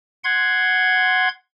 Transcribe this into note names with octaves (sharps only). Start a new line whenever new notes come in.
F#5 C6 G#6